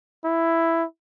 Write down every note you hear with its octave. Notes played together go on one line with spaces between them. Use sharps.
E4